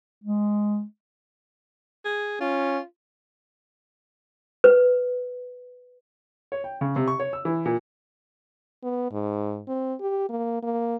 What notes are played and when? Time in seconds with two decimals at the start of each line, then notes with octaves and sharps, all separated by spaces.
0.24 G#3
2.05 G#4
2.41 C#4 F4
4.64 B4
6.52 C#5
6.64 G5
6.81 C#3
6.96 C3
7.08 C#6
7.20 C#5
7.33 E6
7.45 E3
7.65 A#2
8.83 B3
9.12 G#2
9.68 C4
10.01 G4
10.29 A#3
10.63 A#3